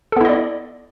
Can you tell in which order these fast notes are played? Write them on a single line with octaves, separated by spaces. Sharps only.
A4 B3 E4 D#5 D5